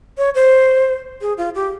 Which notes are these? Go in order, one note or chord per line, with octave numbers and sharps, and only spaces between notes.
C#5
C5
G#4
F4
G4